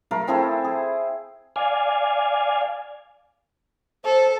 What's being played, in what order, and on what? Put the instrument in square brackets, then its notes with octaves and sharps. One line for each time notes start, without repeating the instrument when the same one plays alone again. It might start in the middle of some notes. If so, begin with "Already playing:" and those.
[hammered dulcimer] A3 A#4 F5 B5
C4 E4 G#4 A4
G#4
[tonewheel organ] D5 F5 G#5
[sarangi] A4 [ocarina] C5